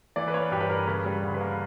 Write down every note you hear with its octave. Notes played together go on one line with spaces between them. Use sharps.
E3 D5
B4
A#3 C#5
G2 G4
B4
G2 A#4
C#3 B4
G3
D2
B4
A#3